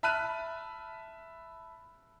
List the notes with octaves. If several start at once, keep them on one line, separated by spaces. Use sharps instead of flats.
E5 A5 B5 F6 F#6 D#7